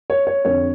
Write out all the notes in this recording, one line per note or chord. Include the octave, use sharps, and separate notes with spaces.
C#5
C#5
F2 D3 C#5